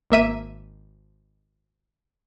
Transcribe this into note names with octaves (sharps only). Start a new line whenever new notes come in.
G#1 A#3 E5 D#7